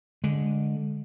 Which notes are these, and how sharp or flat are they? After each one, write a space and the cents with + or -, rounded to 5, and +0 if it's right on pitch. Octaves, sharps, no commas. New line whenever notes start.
D3 -10 G#3 +0